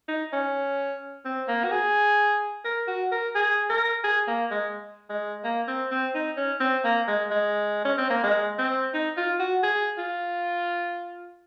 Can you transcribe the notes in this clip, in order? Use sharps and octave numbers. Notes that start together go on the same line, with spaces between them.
D#4
C#4
C4
A#3
F#4
G#4
A#4
F#4
A#4
G#4
A#4
G#4
A#3
G#3
G#3
A#3
C4
C4
D#4
C#4
C4
A#3
G#3
G#3
C#4
C4
A#3
G#3
C4
D#4
F4
F#4
G#4
F4